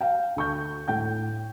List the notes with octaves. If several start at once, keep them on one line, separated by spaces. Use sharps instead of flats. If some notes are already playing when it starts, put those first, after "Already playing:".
F5 G5
D2 C#6 G6
A2 G5 G6